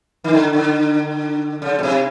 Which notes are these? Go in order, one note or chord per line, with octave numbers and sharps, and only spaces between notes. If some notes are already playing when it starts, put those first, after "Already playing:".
D#3
D3
D3
C#3
B2
C3